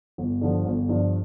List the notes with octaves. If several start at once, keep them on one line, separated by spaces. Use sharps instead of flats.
G1
G2 D3 F3
G1
G2 D3 F3